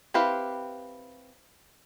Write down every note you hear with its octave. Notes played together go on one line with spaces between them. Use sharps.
C4 E4 G4 B4 F5